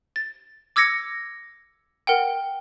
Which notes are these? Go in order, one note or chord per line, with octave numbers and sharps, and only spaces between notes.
A6
D6 E6 G#6 A#6 C#7
A#4 F#5 G5